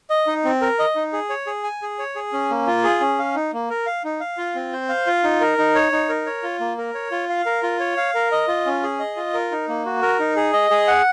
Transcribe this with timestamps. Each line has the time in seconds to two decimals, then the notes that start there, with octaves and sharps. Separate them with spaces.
0.10 D#5
0.27 D#4
0.45 C4
0.62 A#4
0.79 D#5
0.96 D#4
1.13 G#4
1.30 C#5
1.47 G#4
1.64 G#5
1.82 G#4
1.99 C#5
2.16 G#4
2.33 C#4
2.50 A#3
2.67 F4
2.84 G#4
3.01 C#4
3.19 F5
3.35 D#4
3.53 A#3
3.70 A#4
3.86 F5
4.04 D#4
4.20 F5
4.37 F4
4.55 C4
4.73 C5
4.89 F5
5.07 F4
5.24 D#4
5.41 A#4
5.58 D#4
5.75 C#5
5.92 D#4
6.09 A#4
6.26 C#5
6.43 F4
6.60 A#3
6.78 A#4
6.94 C#5
7.11 F4
7.29 F5
7.46 A#4
7.63 F4
7.79 C#5
7.97 F5
8.15 A#4
8.32 D#5
8.48 F4
8.66 C#4
8.83 G#4
9.00 D#5
9.16 F4
9.34 A#4
9.51 D#4
9.69 A#3
9.86 F#4
10.02 A#4
10.19 D#4
10.36 G#4
10.53 D#5
10.70 G#4
10.87 F#5